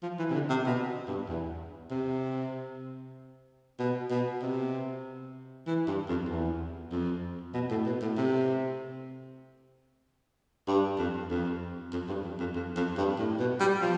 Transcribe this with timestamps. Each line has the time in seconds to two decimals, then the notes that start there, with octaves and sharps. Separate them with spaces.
0.03 F3
0.19 E3
0.30 C3
0.34 D3
0.49 C3
0.66 B2
1.08 G2
1.28 E2
1.90 C3
3.79 B2
4.10 B2
4.42 C3
5.67 E3
5.87 G2
6.08 F2
6.29 E2
6.92 F2
7.54 B2
7.70 A2
7.86 B2
8.01 A2
8.17 C3
10.68 G2
10.98 F2
11.30 F2
11.93 F2
12.09 G2
12.24 F2
12.39 F2
12.56 F2
12.76 F2
12.97 G2
13.18 A2
13.39 B2
13.60 G3
13.81 F3